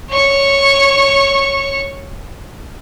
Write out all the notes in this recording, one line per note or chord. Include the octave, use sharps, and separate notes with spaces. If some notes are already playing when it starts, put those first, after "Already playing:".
C#5 C#6